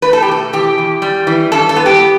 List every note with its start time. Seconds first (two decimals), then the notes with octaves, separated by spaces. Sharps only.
0.02 A3 B4
0.13 A4
0.22 G4
0.28 B2 A4
0.53 E2 G4
0.78 E2
1.02 G3
1.27 E3
1.52 G2 A4
1.69 A4
1.76 B3
1.86 G4
2.02 B3